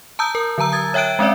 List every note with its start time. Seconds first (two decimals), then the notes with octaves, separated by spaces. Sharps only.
0.19 A5 A#5 D#6 E6 G6
0.35 A#4
0.58 D3 F#3 A5 A#5 E6
0.72 D#6 G#6 A6
0.94 C#5 E5 G5 F#6 D7
1.19 G#3 C4 C#4 D5 E5